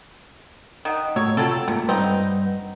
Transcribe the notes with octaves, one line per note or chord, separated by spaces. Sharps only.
D#3 D#5 F#5 D#6
A2 F#4 C#5 A#5 E6
C3 F#3 C4 F4 A4
G#2 C3 A3 A#3 F4
G2 C4 D#4 B4 F#5